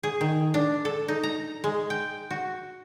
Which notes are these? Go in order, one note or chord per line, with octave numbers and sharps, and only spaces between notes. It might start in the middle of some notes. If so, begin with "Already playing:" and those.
G#4
D#3
D4
A4
D#4
A#5
G#3
G5
F#4